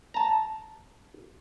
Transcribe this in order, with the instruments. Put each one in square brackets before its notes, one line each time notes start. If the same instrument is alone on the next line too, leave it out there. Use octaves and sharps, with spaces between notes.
[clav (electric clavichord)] A5 A#5